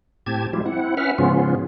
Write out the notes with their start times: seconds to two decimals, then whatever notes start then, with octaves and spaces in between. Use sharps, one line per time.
0.26 A2 C4 G4 A5 G#6
0.53 F3 G3 G#3 E4 F4 G4
0.65 C4 E4 F#5
0.97 C#4 B4 E5 F#5 F6
1.18 G#2 C#3 F3 B3 C#4 F4